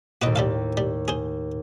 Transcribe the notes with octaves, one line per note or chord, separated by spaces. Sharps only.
D#2 A2 F#4 B4 D#5 D7
G3 A4 F5
G3
G#4 C5